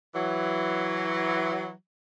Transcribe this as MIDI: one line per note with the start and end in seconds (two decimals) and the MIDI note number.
0.14 1.71 52
0.14 1.71 54